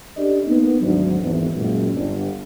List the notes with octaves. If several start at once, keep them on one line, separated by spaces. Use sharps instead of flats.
C#4 D4 G4 A4 D5 D#5
A#3 B3 D#4
G#1 D2 F#3
G#1 E2
C#2 F#2 A#2
G1